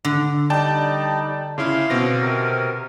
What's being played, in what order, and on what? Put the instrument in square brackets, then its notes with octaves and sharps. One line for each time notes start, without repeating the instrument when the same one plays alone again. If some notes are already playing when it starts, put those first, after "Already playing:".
[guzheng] D3
[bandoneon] G3 D#4 [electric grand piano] D5 G5 A5
[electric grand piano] C#3 C#4 E4 [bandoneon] F5 C6 D6
[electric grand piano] B2 C4 A#6
[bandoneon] C3 A#4